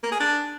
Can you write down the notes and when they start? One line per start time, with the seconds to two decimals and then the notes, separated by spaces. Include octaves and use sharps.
0.03 A#3
0.12 G#4
0.20 D4